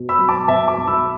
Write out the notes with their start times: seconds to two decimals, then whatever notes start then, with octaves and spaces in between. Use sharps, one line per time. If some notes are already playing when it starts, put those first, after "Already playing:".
Already playing: B2
0.09 B5 E6
0.19 F#3
0.29 A5 D6
0.48 B2 E5 A5
0.68 A5 D6
0.78 B1
0.88 B5 E6